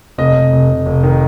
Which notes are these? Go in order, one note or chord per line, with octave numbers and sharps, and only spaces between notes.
F1 D#5
F1
F1
F1
F1
D#3